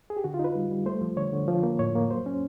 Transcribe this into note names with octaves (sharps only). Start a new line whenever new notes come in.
G#4
G4
D3 F#4
F4
D#4 B4
G3
G3
A3 C5
F3
D3 C#5
D3
F3
A#3
A2 C#5
A#3
F#3 C5
C#4